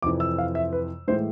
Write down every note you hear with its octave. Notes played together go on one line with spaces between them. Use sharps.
F2 C3 E3 D6
E6
F5
E5
B4
A2 E3 G#3 C5